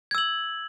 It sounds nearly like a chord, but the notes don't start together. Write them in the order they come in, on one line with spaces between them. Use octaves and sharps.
G#6 E6 F#7